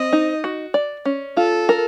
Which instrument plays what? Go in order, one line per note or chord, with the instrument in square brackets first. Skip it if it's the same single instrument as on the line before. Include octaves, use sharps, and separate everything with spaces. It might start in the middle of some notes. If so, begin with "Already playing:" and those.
Already playing: [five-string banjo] C4 [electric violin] D#5
[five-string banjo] D#4
F#4
D5
C#4
[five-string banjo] F4 [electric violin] A4
[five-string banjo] A#4